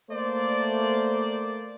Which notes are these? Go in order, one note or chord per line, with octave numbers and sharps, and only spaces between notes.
A3 A#3 C5 D5